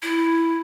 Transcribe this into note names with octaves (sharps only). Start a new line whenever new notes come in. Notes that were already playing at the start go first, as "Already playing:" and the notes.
E4